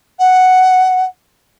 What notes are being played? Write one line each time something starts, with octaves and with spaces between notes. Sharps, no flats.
F#5